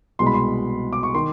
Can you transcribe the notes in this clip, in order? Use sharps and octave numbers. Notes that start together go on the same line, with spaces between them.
C2 B2 G#3 C6
B5
C6
D6
C#6
D#3 C6